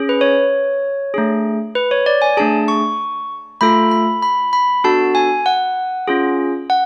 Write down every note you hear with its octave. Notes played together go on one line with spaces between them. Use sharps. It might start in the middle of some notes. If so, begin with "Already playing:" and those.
Already playing: C#4 G#4
B4
C#5
A3 D4 G#4
B4
C#5
D5
G#5
A3 D4 G#4 A5
C#6
A3 F4 A4 B5
B5
B5
B5
B3 D4 F#4 A4 A5
G#5
F#5
C#4 F4 G#4
F#5